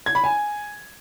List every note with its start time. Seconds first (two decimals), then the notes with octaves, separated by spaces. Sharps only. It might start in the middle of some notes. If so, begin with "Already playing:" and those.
0.06 G#6
0.15 B5
0.24 G#5